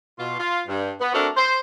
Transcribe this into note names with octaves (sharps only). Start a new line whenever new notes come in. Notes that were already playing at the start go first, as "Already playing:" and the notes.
B2 F4
F4
G2
B3
A3 C4 D4 F#4 A4 A#4
C5